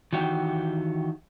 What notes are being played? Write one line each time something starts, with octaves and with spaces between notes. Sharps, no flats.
D#3 E3 F#4 G4